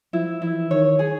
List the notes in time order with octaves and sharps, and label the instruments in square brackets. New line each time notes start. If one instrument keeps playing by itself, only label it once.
[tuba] F3 [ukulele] E4
[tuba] E3 [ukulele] E4
[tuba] D#3 [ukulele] C#5
[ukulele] G#4